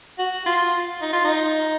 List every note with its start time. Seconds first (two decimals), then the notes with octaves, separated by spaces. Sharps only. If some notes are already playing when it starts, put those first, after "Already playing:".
0.19 F#4
0.46 F4
1.02 D#4
1.13 F4
1.25 D#4